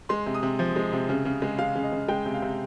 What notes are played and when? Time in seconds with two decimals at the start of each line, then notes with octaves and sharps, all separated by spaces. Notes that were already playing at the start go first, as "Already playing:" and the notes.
0.09 G#3 C6
0.26 C3
0.34 D#6
0.43 C3
0.59 F3
0.76 G#3
0.93 C3
1.09 C#3
1.25 C#3
1.42 G#3
1.59 G#3 F5
1.75 C#3
1.83 D#5
1.92 C#3
2.08 G#3 G5
2.25 C3
2.34 F5
2.42 C3